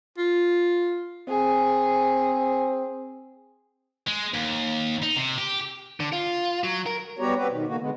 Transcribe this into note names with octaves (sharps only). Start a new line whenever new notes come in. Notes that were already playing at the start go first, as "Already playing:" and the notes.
F4
C4 G#4
G#3
D#2
D#4
C3
G4
D3
F4
F#3
A#4
G3 B3 F#4 G4 C#5 A#5
C4 F#4 G4 B4
B2 D#3
B2 D3 D#3 A#3 F#4
D3 G#3 B3